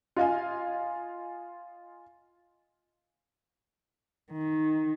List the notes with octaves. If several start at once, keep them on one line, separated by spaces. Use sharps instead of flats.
F4 D#5 F5 G#5
D#3